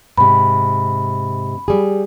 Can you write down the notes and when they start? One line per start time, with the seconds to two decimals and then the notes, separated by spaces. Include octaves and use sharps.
0.18 G#2 C3 B5
1.68 G3 G#4